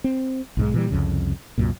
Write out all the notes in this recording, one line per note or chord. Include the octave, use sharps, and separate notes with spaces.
C4
B1 G#2 G#3
A#2 E3 G3
C2 F2 C#3
C2 F#2 A#2